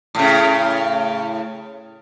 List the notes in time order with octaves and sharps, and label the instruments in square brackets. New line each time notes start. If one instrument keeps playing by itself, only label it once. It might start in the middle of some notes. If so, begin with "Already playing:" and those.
[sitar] A2 C#3